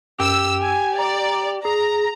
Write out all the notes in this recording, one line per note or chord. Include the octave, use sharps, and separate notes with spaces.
F#2 G4 E6
G#5
D5 A#5
G#4 A#5